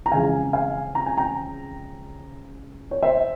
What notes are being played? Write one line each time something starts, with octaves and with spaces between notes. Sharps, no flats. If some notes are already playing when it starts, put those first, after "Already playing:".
A#5
F2 C#3 E3 G#3 F5 G#5
F5 G#5
A#5
G#5
G5 A#5
C#5
C5 E5